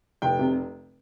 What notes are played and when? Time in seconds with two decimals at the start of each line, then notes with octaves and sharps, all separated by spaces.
0.22 F1 G5
0.39 C3